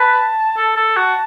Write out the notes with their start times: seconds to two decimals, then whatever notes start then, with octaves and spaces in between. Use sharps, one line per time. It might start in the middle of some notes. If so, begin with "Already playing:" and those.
Already playing: B4 A5
0.57 A4
0.76 A4
0.96 F#4 A5